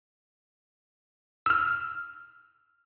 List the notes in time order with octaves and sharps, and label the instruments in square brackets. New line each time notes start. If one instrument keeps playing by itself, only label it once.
[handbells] E6 F6